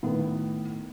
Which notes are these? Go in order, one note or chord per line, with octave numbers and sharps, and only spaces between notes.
A2 D#3 B3